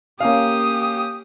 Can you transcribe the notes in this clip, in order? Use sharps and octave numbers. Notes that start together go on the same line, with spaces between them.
A#3 C#4 G4 F5 D#6